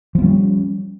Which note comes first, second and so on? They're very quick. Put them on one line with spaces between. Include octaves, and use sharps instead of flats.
F3 B3 G3 C#4